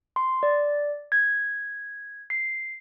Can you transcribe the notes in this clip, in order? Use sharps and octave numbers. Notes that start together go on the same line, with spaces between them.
C6
D5
G#6
C7